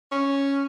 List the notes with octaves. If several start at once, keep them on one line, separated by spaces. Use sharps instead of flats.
C#4